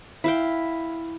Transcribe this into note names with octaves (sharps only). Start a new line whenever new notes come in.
E4 F5 G5